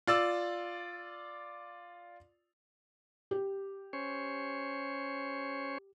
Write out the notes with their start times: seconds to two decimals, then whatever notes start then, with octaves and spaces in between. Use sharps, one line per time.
0.07 F4 D5 E6
3.31 G4
3.93 C#4 C5 C#5